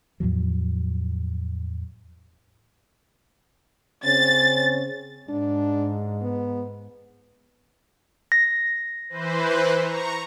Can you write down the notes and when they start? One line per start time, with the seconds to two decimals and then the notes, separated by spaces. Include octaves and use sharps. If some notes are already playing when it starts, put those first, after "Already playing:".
0.20 E2 A2 F3 F#3
4.04 C#3 C4 C#4 A6
5.30 G#2 D4
6.22 B3
8.32 A#6
9.09 E3 B4 C5
9.79 A#5 C#6